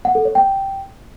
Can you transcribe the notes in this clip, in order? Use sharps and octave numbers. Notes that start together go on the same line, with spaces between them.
F#5
A4
C#5
G5